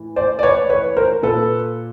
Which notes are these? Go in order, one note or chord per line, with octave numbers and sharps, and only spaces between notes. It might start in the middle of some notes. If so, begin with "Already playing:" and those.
Already playing: A2 E3
C5 D5
D5
B4 C#5
B4 C#5
A#4 C5
A#2 A4 B4